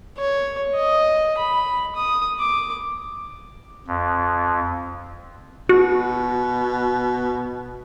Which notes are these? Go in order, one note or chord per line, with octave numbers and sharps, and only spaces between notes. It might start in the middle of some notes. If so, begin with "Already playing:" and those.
C#5
D#5
B5
D#6
D6
F2
B2 F#4